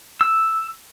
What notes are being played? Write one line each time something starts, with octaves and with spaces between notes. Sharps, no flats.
E6